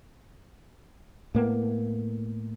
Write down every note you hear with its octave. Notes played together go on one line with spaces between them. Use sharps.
A2 A#3 B3